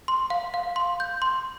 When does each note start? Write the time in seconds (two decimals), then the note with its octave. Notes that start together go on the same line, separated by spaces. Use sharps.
0.08 C6
0.30 F5
0.54 F5
0.76 C6
1.00 G6
1.22 C6